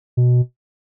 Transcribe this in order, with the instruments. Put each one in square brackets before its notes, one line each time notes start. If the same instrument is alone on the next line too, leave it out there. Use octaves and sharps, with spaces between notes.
[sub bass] B2